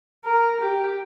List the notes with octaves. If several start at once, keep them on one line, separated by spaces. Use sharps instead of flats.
A#4
G4